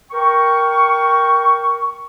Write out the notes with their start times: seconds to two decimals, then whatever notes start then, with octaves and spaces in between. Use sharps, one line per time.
0.11 A#4 G5 C#6